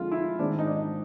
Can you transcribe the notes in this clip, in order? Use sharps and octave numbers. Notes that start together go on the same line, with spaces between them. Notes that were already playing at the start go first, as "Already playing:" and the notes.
Already playing: F2 D3 F3 G#3 F4
E4
G#2 D#3 G#3 C4 D4
D#4
D4